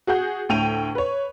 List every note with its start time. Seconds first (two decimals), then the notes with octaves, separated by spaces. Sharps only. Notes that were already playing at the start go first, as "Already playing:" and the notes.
0.07 F#4 G#4 F#5 G6
0.49 D2 A2 G5 D#7 F7
0.95 B4 C#5